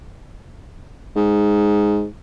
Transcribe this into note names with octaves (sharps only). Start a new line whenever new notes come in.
G#2